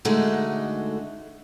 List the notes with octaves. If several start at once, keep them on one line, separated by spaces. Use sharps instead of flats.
D3 G#3 A3 D#4 F#4